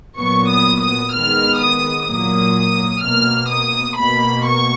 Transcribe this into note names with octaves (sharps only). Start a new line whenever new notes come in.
A#2 F#3 B3 C#6
D#6
D#6
D#3 G#3 B3 F6
D#6
A#2 F#3 A#3 D#6
B2 A#3 F6
D#6
B2 A#3 B5
C#6